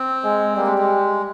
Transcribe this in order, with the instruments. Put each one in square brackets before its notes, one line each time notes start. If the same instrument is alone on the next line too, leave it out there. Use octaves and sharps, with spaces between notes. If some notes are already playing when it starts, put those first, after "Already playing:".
Already playing: [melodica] C4
[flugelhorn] G#3
[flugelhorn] G3 [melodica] A#3
[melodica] G#3
G#3